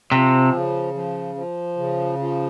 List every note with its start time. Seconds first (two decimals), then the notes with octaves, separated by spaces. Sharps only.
0.11 C3 F3
0.52 C#3
0.94 F3
1.35 F3
1.77 C#3
2.19 F3